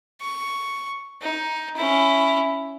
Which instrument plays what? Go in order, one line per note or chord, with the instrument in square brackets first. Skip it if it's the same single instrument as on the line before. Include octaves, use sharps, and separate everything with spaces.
[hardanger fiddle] C#6
D#4
C#4 E4